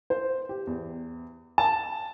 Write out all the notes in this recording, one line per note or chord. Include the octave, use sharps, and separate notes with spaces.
C5
G4
E2
A5